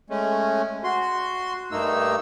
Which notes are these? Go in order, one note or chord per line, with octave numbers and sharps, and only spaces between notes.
G#3 A3 C#4
F#4 C6
G2 A3 A#3 D#4 E6